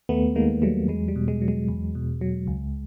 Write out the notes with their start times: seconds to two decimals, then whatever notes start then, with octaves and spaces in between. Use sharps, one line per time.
0.09 D#2 A3 B3
0.36 D#3 G#3 A#3
0.62 F#3 G3 A3
0.88 E2 G#3
1.08 G3
1.16 B2
1.28 G#3
1.42 F#3
1.48 G#3
1.68 E2
1.95 B2
2.21 F#3
2.48 C#2